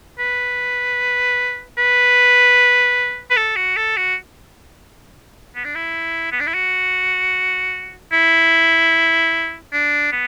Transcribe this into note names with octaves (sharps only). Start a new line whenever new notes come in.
B4
B4
B4
A4
F#4
A4
F#4
B3
D4
E4
B3
D4
E4
F#4
E4
D4
B3